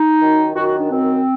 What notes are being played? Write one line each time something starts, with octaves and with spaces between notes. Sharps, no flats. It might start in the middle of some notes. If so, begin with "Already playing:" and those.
Already playing: D#4
F#2 D#3
F#2 D#3 F#4
F#4
D4
F#2 D#3 C4